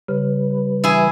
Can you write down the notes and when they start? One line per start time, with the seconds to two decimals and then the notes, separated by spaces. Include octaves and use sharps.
0.08 C#3 G3 B4
0.84 E3 E4 G#4